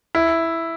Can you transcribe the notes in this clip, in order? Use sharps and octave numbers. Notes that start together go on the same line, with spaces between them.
E4